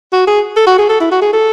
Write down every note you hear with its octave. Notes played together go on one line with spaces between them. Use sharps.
F#4
G#4
A4
F#4
G#4
A4
E4
F#4
G#4
A4